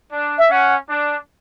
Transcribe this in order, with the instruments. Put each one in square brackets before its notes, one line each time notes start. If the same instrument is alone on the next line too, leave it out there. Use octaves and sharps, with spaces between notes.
[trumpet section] D4
[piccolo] E5
[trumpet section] C#4 [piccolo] F#5
[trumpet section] D4